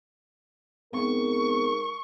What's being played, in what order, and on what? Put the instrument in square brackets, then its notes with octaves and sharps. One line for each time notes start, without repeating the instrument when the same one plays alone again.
[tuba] G#2 [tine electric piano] B3 C4 [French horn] A#4 [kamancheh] C#6